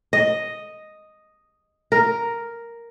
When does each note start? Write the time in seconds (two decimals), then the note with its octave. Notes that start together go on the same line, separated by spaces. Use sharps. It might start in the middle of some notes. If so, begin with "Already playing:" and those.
0.13 D#5
1.92 A#4